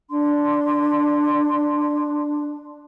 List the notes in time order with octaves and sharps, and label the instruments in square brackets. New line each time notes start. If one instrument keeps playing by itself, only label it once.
[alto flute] D4 [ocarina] C6